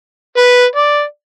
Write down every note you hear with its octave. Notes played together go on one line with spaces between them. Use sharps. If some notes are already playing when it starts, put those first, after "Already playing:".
B4
D5